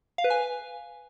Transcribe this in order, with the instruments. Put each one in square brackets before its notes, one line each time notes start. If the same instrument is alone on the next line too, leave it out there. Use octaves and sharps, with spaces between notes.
[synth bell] F5
B4
G#5